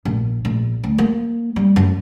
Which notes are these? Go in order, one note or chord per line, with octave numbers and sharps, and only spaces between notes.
A#1
A#1
D2
A#3
G3
F#2